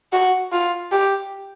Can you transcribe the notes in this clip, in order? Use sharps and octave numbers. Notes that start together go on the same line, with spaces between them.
F#4
F4
G4